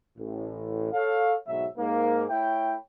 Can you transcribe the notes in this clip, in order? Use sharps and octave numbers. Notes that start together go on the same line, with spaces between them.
A1 A2
A4 C#5 F5
B1 G#2 B2 F#3 E5
G#2 A#3
A3 E4 A4 C#5 G5